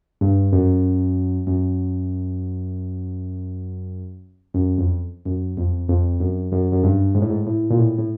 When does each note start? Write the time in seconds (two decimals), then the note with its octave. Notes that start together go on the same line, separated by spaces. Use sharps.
0.21 G2
0.52 F#2
1.47 F#2
4.54 F#2
4.78 F2
5.26 F#2
5.57 F2
5.88 F2
6.20 F#2
6.52 F#2
6.72 F#2
6.84 G2
7.15 G#2
7.22 A2
7.30 G#2
7.46 A2
7.70 A#2
7.78 A2
7.98 A2